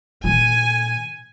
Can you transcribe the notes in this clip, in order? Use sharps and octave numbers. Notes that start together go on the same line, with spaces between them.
A#2 D#3 G#5